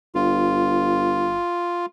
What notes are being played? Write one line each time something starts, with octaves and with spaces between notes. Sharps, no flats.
G1 F4